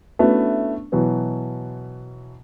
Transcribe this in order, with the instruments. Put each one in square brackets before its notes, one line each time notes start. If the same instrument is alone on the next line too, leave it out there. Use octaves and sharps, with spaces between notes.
[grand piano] A3 B3 C#4 D4 E4 F#4
B2 E3 F#3 B3